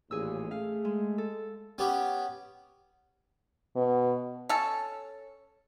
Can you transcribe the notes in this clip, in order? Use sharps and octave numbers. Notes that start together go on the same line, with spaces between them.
A1 D#2 A#2 G#4 E6
A3 G#4 F5
G#3
A4
B3 C#4 G4
B2
C#4 A4